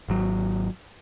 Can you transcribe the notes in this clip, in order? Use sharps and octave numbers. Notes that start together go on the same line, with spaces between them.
G#1 F#3